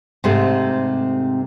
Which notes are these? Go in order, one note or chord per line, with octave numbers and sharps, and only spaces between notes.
G#2 C3 A3